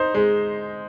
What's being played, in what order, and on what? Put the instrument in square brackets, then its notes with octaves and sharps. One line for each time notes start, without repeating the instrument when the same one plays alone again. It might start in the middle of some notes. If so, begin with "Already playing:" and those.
Already playing: [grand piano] D#4 C5
G#3